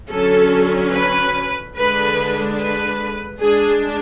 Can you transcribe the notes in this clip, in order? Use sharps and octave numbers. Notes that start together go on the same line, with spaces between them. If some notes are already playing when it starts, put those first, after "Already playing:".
D3 F#3 C#4 A4
B4
D3 G#3 D4 B4
B4
G#3 D4 G#4